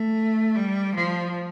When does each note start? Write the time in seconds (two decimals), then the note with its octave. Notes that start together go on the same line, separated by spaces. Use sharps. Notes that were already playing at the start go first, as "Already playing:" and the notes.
Already playing: A3
0.55 G3
0.95 F3